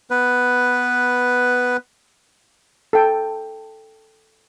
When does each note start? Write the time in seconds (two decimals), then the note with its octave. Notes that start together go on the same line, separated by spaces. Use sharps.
0.11 B3 B4
2.93 A4 G5